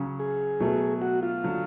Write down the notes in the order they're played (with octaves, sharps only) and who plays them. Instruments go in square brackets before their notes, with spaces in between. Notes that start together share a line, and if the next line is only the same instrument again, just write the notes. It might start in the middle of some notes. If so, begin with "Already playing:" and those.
Already playing: [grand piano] C#3 F#3 C#4
[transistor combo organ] G#4
[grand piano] B2 F#3 A3
[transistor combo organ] F#4
F4
[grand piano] D3 F#3